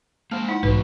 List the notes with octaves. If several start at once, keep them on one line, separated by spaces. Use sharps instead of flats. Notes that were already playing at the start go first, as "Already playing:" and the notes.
G#3 A#3 C5 A5
D#4 E4 F#5
B1 G#2 D#3 E3 D#4 F#4 B4